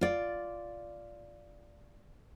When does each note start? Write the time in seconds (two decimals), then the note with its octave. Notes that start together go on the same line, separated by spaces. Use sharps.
0.01 F4 D5